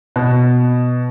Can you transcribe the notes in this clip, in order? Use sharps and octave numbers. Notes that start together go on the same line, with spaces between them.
B2